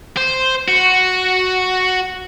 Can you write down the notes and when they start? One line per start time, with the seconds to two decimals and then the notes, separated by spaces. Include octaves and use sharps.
0.17 C5
0.68 F#4